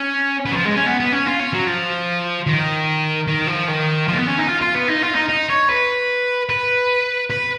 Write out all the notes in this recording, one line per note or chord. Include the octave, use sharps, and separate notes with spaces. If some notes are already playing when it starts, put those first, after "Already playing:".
Already playing: C#4
B3
F#3
F3
G#3
C#4
B3
B3
C#4
F4
C#4
F#3
F3
D#3
D#3
F3
D#3
F3
A#3
B3
C#4
D#4
F4
F4
B3
D#4
F4
D#4
D#4
C#5
B4
B4
B4